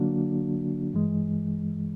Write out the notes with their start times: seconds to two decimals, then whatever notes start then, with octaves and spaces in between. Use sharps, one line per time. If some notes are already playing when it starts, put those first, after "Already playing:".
Already playing: D3 F#3 A#3 D4 F#4
0.94 G2 E3 G#3